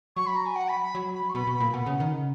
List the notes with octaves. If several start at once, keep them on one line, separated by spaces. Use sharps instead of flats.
F#3 C#6
B5
A#5
G#5
F#5
B5
B5
F#3
B5
C#6
B2 B5
B2
B5
A#2
B2 F#5
C#3
D#3
C#3